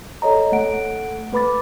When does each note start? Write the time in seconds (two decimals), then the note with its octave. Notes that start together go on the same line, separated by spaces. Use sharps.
0.22 A4 C#5 D#5 A#5
0.52 A3 A4 F#5 D7
1.33 A3 B4 B5 D6 A6